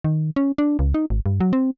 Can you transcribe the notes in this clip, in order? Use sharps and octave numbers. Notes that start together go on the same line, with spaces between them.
D#3
C#4
D4
C#2
D#4
G#1
G2
F#3
C4